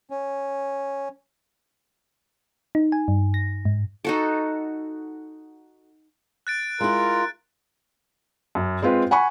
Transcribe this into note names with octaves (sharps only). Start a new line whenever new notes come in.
C#4
D#4
G#5
G2
A#6
G#2
D#4 F#4 A4
F#6 A6 D7
G#3 E4 F4 A#4
F#2
G#3 C4 F4 B4
F#5 G#5 B5 C#6